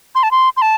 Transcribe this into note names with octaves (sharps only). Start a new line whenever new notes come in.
C6
A5
C6
C6
A5